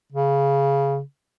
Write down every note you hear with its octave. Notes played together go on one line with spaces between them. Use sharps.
C#3